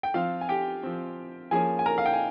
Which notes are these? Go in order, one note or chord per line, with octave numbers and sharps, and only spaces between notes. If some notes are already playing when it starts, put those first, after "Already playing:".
G5
F3 C4 F4 F5
G#5
G4 G5
F3 C4
F3 A#3 C#4 G#4 G#5
G#5
A#4 A#5
F5
G5
G#5